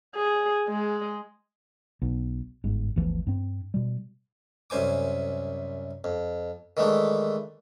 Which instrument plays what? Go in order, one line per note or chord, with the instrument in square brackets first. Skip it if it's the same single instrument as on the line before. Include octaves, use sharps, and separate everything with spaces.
[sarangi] G#4
G#3
[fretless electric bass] B1 B2
G1 G#2
G1 D2 E3 F3
G2 C4
B2 G3
[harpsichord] C2 F#2 C5 G#5 D6
F2
D#3 E3 G#3 A3 D4